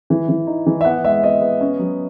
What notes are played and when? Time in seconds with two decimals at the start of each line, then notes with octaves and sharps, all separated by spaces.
0.10 E3
0.29 E3
0.47 D#4
0.67 E3
0.81 E5
0.85 B3 F#5
1.04 G#3 E5
1.23 B3 D#5
1.41 B3
1.61 C#4
1.79 F#3